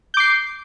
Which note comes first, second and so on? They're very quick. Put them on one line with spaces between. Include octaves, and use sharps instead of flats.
G6 D6 C7